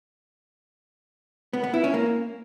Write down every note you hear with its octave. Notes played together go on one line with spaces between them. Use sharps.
B3
B3
E4
C#4
A#3